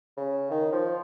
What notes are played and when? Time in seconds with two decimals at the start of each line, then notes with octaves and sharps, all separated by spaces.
0.17 C#3
0.51 D#3
0.72 F3